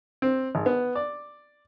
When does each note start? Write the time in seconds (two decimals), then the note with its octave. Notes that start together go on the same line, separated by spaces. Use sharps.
0.22 C4
0.55 G#1
0.66 B3
0.95 D5